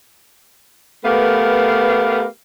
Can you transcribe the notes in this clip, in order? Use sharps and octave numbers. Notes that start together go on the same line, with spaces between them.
A3 B3 G4 A#4 B4 F5